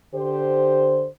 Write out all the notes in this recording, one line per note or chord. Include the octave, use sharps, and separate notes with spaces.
D3 G4 C5